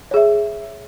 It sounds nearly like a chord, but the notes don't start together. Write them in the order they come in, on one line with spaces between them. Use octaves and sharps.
C#5 G#4 E5